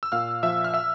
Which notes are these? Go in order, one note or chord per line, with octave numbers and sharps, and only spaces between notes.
E6
A#2 F5 F6
F3 E5 E6
F6
E5 E6